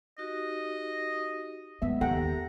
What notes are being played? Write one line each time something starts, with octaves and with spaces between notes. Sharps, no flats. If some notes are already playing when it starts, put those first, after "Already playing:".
D#4 F#4 G4 D#5
D#2 G#2 B3 E5
D#2 G4 A4 F#5 G5 A#5